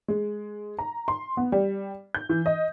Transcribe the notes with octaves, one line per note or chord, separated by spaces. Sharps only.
G#3
A#5
C6
B3
G3
G6
E3
D#5